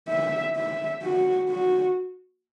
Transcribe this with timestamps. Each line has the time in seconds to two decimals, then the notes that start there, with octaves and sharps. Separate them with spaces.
0.09 E5
0.56 E5
1.03 F#4
1.50 F#4